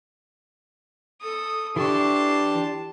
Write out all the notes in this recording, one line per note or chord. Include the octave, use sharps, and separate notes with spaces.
A4 D#6
E3 D4 G4 A5 C6 C#6